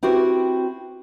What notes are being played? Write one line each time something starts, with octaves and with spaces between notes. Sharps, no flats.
C4 E4 F#4 G4 B4 C5